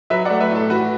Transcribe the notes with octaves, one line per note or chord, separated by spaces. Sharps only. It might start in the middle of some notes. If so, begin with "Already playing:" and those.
F#3 B4 E5
A3 D5 F#5
B4 E5
A2 A4
E3 F#4 B4